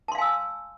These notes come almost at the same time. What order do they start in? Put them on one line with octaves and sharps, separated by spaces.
A5 C6 F5 G#5 E6